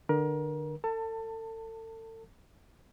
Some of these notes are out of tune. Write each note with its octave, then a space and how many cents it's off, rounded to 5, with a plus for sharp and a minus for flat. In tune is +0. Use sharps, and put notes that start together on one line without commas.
D3 +25 A#4 +30
A4 +35 A5 +20